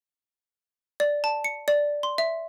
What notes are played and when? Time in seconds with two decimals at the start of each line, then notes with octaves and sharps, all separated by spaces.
1.00 D5
1.24 A5
1.44 C#7
1.68 D5
2.03 C6
2.18 E5